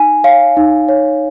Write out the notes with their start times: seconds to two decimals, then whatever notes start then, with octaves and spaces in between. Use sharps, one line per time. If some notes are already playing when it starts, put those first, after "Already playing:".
Already playing: D#4 G#5
0.24 C#5 F5
0.57 D#4
0.89 C#5